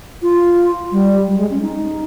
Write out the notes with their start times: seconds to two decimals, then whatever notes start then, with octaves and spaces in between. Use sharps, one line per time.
0.22 F4
0.92 G3
1.27 G3
1.38 G#3
1.50 C#4
1.62 D#4